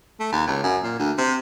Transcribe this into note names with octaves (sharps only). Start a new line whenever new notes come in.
A3
D#2
C#2
F#2
A#2
D2
C3